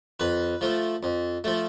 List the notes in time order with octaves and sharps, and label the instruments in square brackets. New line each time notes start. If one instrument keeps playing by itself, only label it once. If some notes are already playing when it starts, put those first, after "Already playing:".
[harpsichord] F2 B4
F3 A3
F2
F3 A3